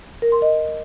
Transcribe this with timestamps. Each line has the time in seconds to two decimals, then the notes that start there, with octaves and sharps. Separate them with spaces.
0.22 A#4
0.32 C6
0.42 D#5